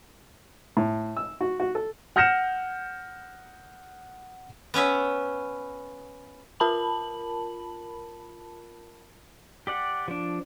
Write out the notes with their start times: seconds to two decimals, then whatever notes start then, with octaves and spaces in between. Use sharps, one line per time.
0.77 A2
1.17 E6
1.41 F#4
1.60 F#4
1.75 A4
2.16 F#5 F6 G6 A#6 C#7 E7
4.74 B3 C#4 C#5 E5
6.60 F4 A#4 A5 B5 F#7
9.67 G4 D5 F#5
10.08 F3 D4